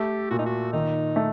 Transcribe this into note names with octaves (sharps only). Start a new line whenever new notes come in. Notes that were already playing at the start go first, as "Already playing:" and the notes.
Already playing: A3 G4
A#2 F#4
D#4
F#4
D#3 D#4
A3